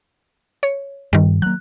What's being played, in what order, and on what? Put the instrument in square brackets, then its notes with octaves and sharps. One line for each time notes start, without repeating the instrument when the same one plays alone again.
[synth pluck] C#5
[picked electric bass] G2 [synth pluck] D#3 G3
[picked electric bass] F#3 A#3 [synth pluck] F#6